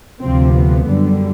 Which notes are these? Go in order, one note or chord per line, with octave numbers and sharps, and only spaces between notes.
D2 C3 F3 C4
B3
F#2 D3 G3